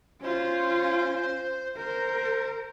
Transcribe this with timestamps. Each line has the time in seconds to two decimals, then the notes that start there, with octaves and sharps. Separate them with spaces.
0.21 C#4 F4 C5
1.77 A#4 C5